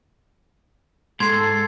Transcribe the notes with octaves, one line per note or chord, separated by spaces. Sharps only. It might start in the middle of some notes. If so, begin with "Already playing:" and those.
G#2 A4 C6 G#6 C7